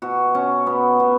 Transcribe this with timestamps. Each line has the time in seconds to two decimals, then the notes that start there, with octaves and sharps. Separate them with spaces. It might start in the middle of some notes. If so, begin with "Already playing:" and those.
0.02 B2 F#4
0.34 B2 C#4
0.67 B2 B3
1.00 B2 B3